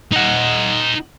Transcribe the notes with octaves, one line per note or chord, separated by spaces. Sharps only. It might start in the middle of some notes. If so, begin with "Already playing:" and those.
D#4 F#5